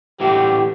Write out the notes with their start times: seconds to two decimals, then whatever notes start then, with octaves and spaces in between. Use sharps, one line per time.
0.20 A2 E3 A3 D4 F#4 G4